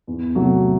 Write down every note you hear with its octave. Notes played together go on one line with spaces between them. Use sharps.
E2
C3 F#3 A3